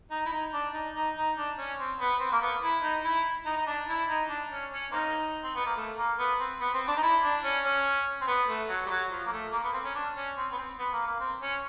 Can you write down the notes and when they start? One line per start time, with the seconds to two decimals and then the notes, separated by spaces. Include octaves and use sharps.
0.11 D#4
0.26 E4
0.32 D#4
0.53 D4
0.74 D#4
0.95 D#4
1.16 D#4
1.37 D4
1.58 C#4
1.78 C4
2.00 B3
2.20 C4
2.32 A#3
2.41 B3
2.62 E4
2.83 D#4
3.04 E4
3.46 D#4
3.57 D#4
3.67 D4
3.88 E4
4.08 D#4
4.29 D4
4.51 C#4
4.71 C#4
4.92 A#3 C4 D#4
5.43 C4
5.55 B3
5.65 A#3
5.76 A3
5.97 A#3
6.18 B3
6.38 C4
6.60 B3
6.74 C4
6.88 D4
6.97 D#4
7.02 E4
7.23 D4
7.43 C#4
7.65 C#4
8.21 C4
8.27 B3
8.48 A3
8.69 F#3
8.86 G3
8.90 F#3
9.11 F3
9.26 A#3
9.32 A3
9.52 A#3
9.63 B3
9.73 C4
9.84 C#4
9.95 D4
10.15 C#4
10.37 C4
10.51 B3
10.57 C4
10.78 B3
10.93 A#3
11.06 A#3
11.20 C4
11.42 C#4